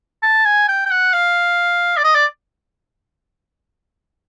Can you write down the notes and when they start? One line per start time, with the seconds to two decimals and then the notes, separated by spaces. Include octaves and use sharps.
0.23 A5
0.45 G#5
0.68 G5
0.86 G5
0.91 F#5
1.13 F5
1.97 D5
2.04 D#5
2.15 D5